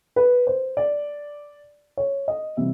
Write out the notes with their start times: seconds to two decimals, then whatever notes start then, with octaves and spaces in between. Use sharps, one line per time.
0.16 B4
0.47 C5
0.77 D5
1.97 C#5
2.28 D#5
2.57 C3 E3 G3 E5